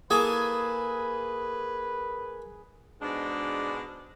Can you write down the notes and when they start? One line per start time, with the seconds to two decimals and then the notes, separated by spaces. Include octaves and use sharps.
0.10 A#3 E4 G#4 A4 B4
3.02 G#2 B2 G#3 D4